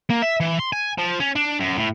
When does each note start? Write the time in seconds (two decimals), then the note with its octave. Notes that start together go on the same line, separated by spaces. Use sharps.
0.10 A#3
0.22 E5
0.40 E3
0.59 C6
0.73 G#5
0.98 F3
1.20 C#4
1.36 D4
1.60 F#2
1.77 A2